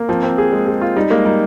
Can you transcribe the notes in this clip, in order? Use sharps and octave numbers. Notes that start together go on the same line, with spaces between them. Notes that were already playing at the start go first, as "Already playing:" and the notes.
Already playing: A#3
F3 C4
C4
G#4
G#3
G#4
F4
G3 D#4
G#3 A#3
G3 D#4